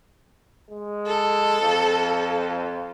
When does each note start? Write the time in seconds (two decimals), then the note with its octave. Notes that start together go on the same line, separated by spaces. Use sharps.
0.70 G#3
1.07 A4
1.60 F2